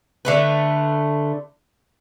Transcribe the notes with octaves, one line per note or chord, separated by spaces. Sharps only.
D3 A3 B4